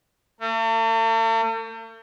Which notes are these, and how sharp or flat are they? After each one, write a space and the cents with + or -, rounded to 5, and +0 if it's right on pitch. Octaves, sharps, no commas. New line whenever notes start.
A3 +45